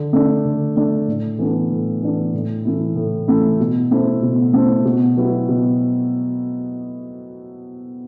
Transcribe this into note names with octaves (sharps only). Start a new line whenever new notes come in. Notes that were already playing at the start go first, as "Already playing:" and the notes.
Already playing: D3
A3 D4
D3
A3 D4
A2
E3 B3 D4 A4
A2
E3 B3 D4 A4
A2
E3 A3 E4
A2
E3 A3 E4
B2
A3 E4 A4 C5
B2
A3 E4 A4 C5
B2
F#3 B3 E4 G4
B2